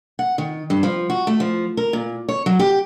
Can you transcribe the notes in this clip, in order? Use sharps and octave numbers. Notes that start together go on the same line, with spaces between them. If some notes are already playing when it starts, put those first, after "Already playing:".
F#5
D#3
G2
F3
F#4
A3
F3
A#4
A#2
C#5
F#3
G4